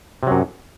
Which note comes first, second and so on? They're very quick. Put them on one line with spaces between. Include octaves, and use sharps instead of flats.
C3 F#3 F#2